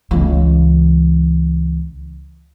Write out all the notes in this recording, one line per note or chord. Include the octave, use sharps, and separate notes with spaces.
C#2 E3